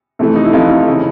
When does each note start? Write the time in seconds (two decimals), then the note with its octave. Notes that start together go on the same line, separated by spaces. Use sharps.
0.19 F2 C3 E3 A3
0.36 D#4
0.44 E4
0.53 F2 C3 E3 A3 D#4 F4
0.88 C#3 E3